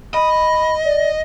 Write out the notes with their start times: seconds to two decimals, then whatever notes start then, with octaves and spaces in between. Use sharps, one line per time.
0.14 D#5 B5
0.85 D5